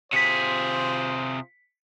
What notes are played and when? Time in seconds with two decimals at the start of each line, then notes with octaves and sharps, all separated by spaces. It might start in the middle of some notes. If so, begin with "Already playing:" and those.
0.13 C3 F4 G#4 C5 B6 C#7